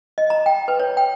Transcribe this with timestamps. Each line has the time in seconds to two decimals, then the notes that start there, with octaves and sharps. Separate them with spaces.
0.18 D#5
0.30 A#5
0.46 G5
0.68 B4
0.80 C#5
0.97 G5